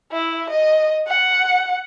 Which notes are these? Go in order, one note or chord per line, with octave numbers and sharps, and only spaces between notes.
E4
D#5
F#5